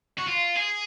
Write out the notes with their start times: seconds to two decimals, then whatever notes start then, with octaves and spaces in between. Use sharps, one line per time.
0.18 F#4
0.27 F4
0.56 G#4